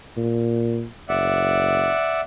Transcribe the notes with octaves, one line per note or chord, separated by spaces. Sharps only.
A#2
F#1 D5 E5 F#5